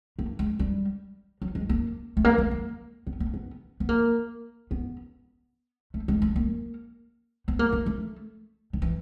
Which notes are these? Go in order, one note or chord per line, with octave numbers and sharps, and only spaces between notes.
A#3
G#3
G3
F#3
G#3
A#3
A3
A#3
B3
A#3
B3
A#3
B3
B3
A#3
B3
A3
G#3
A3
A#3
B3
A#3
A#3
A3
D#3
E3